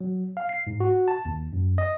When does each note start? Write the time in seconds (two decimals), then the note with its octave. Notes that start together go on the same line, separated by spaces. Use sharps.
0.01 F#3
0.37 F5
0.49 C7
0.67 G#2
0.80 F#4
1.08 A5
1.25 D#2
1.53 F#2
1.78 D#5